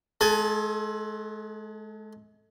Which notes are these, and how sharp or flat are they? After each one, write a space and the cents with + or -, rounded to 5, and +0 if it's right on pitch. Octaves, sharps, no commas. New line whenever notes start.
G#3 +35 A4 +0 G#5 +20